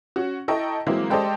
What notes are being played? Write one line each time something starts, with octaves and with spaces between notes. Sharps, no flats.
C#4 F#4
E4 A4 D#5 G5 A#5 C#6
E3 F#3 G#3 A#3 C4 E4
G#3 G4 A4 C5 D5 D#5